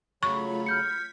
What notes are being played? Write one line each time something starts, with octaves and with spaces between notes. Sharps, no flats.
C#3 F#3 A3 F4 C#5 B5 C#6
F6 G6 G#6 B6 C#7